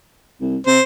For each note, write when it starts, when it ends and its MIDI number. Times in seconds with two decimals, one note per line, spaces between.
0.40 0.57 36
0.67 0.79 48
0.67 0.82 72